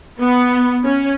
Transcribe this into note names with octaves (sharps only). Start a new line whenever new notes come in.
B3
C#4